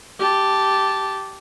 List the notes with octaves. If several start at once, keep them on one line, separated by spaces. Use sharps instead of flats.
G4 A5